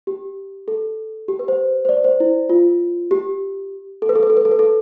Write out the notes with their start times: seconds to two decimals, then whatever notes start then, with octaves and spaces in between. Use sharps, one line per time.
0.07 G4
0.68 A4
1.28 G4
1.39 B4
1.48 C5
1.85 C5
1.89 D5
2.04 C5
2.20 E4
2.49 F4
3.11 G4
4.02 A4
4.09 B4
4.16 A4
4.23 B4
4.30 A4
4.37 B4
4.45 A4
4.51 B4
4.59 A4